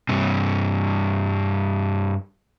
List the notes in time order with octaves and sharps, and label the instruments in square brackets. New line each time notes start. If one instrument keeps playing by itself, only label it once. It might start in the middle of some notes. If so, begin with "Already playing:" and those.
[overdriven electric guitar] G2 C3